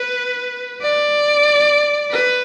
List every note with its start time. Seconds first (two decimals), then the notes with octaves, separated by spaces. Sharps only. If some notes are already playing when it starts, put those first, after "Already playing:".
Already playing: B4
0.82 D5
2.11 B4